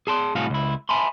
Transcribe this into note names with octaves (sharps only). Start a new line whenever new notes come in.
G#4 A5 C6
C2 A2 F#4 G#4 A4 F5
C#2 E4
E5 G#5 A5 B5 C6